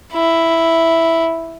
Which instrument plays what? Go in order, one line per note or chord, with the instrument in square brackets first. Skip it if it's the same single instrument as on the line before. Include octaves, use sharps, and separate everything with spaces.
[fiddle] E4